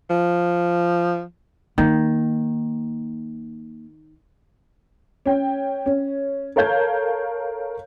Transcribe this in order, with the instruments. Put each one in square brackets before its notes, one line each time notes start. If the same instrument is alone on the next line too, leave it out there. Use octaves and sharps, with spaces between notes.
[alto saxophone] F3
[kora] D#3 [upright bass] A#3
[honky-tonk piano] C#4 G5
C#4
A4 A#4 C#5 F5 G6 G#6